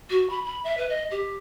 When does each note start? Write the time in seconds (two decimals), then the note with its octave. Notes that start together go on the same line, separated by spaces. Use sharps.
0.10 F#4
0.29 B5
0.44 B5
0.64 E5
0.77 B4
0.89 D#5
1.11 G4